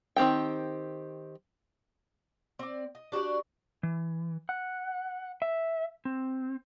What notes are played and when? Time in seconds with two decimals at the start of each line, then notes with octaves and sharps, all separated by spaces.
0.16 D#3 C4 G4 G5
2.59 C4 D5
2.95 D#5
3.12 D4 F#4 G4 D5
3.83 E3
4.49 F#5
5.42 E5
6.05 C4